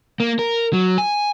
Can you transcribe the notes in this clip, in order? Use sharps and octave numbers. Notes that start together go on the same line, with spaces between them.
A#3
A#4
F#3
G#5